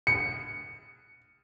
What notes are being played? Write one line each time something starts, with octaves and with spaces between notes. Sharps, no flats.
C#7